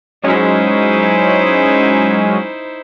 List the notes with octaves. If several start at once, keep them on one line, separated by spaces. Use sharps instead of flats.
F#3 G#3 C#4 D#4 E4 C5